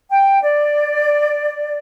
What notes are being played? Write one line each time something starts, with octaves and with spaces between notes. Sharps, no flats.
G5
D5